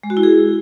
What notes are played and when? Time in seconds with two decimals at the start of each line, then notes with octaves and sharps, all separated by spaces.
0.03 G#3
0.10 F#4
0.17 E4
0.23 G#4